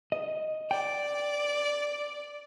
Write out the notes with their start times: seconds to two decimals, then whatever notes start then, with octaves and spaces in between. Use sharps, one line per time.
0.12 D#5
0.71 D5 G5